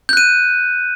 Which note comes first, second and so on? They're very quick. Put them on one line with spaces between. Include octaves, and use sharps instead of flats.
G6 F#6 D#7